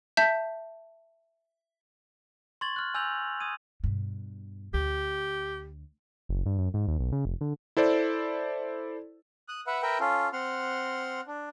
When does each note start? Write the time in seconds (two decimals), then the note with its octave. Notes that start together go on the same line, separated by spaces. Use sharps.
0.17 E5 A5 G6 B6
2.61 C6 C#6 G#6 A6 F#7
2.76 F6 F#6
2.94 G#5 E6 G6 A#6 F7 F#7
3.40 D#6 G#6 D#7
3.84 G2 B2
4.74 D2 G4
6.29 F#1
6.46 G2
6.58 F#2
6.74 G#2
6.88 D#2
6.99 B1
7.12 C#3
7.25 F1
7.41 D3
7.77 E4 A4 C5 D5
9.48 D#6 F#6
9.67 B4 E5 F#5
9.82 A#4 B4 E5 G5
10.00 C#4 F4 A4
10.33 C4 F#5 C6 F6
11.27 D4